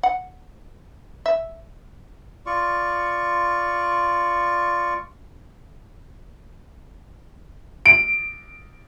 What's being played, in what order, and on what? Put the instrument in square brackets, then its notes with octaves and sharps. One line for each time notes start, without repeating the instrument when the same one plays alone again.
[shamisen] F#5
E5
[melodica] F4 D5 C#6
[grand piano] D7